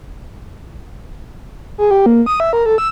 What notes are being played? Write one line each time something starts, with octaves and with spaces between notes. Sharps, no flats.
G#4
G4
A#3
D#6
E5
A#4
A4
E6